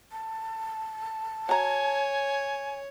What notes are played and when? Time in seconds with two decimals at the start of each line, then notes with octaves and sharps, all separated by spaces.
0.12 A5
1.49 F#4 C#5 G#5 A#5